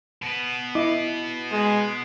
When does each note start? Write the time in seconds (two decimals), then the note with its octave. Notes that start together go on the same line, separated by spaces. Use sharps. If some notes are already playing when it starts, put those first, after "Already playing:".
0.22 B2 B3
0.75 E4 D#5 D6
1.52 G#3